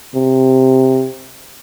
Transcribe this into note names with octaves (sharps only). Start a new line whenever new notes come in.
C3